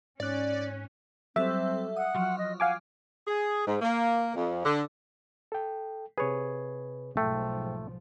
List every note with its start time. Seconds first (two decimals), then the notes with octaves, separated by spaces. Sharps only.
0.20 G#2 C#4 D5 F#6
1.36 F#3 G3 C4 A4 E5
1.97 F#5 D#6
2.15 F3 F#3
2.38 D#5
2.60 F5 F#5 G#5 D6
3.27 G#4
3.67 G#2
3.82 A#3
4.35 F2
4.65 D3
5.52 A4 G5
6.18 C3 G#4 B4 C#5
7.17 B1 G#2 F3 A3 G5